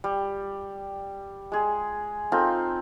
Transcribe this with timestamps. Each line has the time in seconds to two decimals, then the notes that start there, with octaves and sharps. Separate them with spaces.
0.04 G3
1.52 G#3 G#4
2.32 C4 D#4 F4 A4